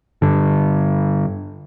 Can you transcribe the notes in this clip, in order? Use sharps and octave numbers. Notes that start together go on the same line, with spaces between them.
G2 D3